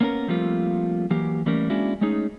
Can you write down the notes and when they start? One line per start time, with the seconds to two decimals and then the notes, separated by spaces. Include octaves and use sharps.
0.01 A#3 B3 C#4 A4 A#4
0.28 F3 G3 A3 A#3 C4 F4
1.11 E3 F#3 A#3 G4
1.46 E3 G3 A3 A#3 C#4 A#4
1.70 G#3 A#3 C#4 D4 E4 F#4
2.01 G#3 A3 C#4 D#4 G#4